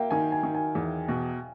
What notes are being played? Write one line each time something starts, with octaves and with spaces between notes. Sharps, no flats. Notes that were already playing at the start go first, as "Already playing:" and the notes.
Already playing: A#3 E5 F5 G5
D#3 G#5
G#5
D#3
G#5
E2
B2